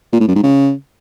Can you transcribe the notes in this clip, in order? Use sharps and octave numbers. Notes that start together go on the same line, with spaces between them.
A#2
A2
F#2
G#2
C#3